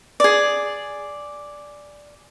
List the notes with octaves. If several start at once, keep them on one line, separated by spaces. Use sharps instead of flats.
G#4 D5